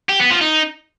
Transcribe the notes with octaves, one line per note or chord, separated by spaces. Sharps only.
G4
B3
F3
D#4